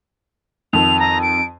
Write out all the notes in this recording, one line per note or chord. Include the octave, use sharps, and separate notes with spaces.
F2 D#3 F7
A#5
D7